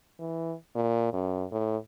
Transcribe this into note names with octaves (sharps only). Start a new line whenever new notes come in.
E3
A#2
F#2
A2